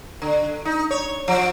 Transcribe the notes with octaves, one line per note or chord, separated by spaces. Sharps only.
D3
D#4
C#5
F3